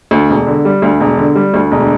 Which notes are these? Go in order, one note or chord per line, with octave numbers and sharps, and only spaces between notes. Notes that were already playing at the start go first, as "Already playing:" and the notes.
D2
E1
D3
G3
D2
E1
D3
G3
D2
E1